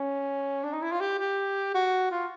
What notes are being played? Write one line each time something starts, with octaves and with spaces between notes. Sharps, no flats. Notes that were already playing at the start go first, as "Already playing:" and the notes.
Already playing: C#4
D4
D#4
E4
F4
G4
G4
F#4
F4